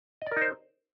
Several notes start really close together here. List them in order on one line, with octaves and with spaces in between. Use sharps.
D#5 D5 A#4 D#4 C5